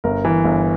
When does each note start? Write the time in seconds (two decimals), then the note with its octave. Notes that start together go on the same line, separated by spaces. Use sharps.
0.04 G1 A#4
0.25 E3
0.45 G1